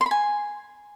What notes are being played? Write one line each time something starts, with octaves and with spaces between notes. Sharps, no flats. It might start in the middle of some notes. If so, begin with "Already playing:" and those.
C6
B5
G#5